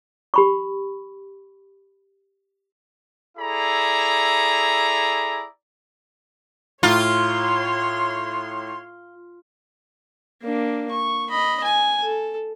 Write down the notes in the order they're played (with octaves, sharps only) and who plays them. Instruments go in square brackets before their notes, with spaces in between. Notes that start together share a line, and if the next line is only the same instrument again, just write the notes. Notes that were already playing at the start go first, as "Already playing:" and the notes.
[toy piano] G4 B5 C#6
[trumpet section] E4 G#4 A4 D5 E5 A#5
[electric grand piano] A2 A#5 [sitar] F4 [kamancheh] C#5 C6
[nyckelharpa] A#3 D4
C#6
D#5 B5
G#5
A4